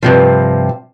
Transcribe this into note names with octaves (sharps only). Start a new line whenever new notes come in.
G2 C3 F3